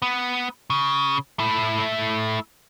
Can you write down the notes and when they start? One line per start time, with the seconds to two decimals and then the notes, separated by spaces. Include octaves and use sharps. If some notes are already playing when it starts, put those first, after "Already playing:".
0.02 B3
0.70 C#3
1.39 A3 E4